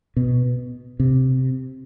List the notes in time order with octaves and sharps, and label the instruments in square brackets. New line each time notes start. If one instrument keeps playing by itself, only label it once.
[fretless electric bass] B2
C3